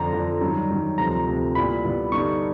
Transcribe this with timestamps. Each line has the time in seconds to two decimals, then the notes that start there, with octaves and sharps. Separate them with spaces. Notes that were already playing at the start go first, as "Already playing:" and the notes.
Already playing: F2 D3 F3 A#5
0.13 F2 D3 F3
0.41 G2 D#3 F#3
0.70 G2 D#3 F#3
0.98 D2 C3 F3 A#5
1.26 D2 C3 F3
1.55 A#2 G3 B3 E4 B5
1.84 A#2 G3 B3 E4
2.12 G2 D3 G3 B3 D#4 C#6